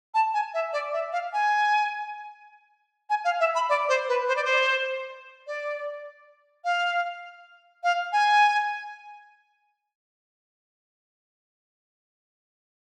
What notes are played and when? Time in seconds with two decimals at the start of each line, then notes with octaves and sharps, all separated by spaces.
0.14 A5
0.34 G#5
0.54 E5
0.73 D5
0.93 E5
1.12 F5
1.33 G#5
3.10 G#5
3.24 F5
3.40 E5
3.55 B5
3.69 D5
3.89 C5
4.09 B4
4.28 C5
4.36 D5
4.45 C5
5.47 D5
6.64 F5
7.84 F5
8.13 G#5